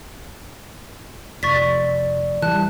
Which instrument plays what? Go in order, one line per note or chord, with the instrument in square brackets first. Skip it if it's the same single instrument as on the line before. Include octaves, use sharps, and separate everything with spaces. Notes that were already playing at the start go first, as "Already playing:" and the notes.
[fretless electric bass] F1 [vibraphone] D5 [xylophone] C#6 A6 B6
[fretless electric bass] E3 G3 [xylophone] A5 F#6